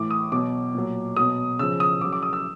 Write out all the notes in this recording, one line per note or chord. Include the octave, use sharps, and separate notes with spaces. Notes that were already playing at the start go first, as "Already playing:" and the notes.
Already playing: A2 E3 D6
D#6
B2 F#3 D6
A#2 F#3
B2 F#3 D#6
C#3 F3 E6
D#6
C#3 F#3 D6
D6
D#6
E6